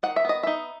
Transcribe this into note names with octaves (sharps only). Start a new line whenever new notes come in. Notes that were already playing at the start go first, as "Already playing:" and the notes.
D#3 F#5
E5
B3 D#5
D#4 E5